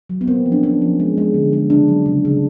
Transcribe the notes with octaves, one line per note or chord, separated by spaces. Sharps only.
F#3
B3
A#3 C4
F3
D4
A#3 C#4
F3
G#3
G#3
D3
G#3
C#3 D4
F#3
C#3
C#3